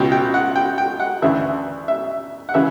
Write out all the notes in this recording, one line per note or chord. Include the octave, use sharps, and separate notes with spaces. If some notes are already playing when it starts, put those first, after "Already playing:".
Already playing: C#2 B2 G5
G5
F#5
G5
G5
F#5
D2 C#3 E3 E5
E5
F#5
C#3 E3 E5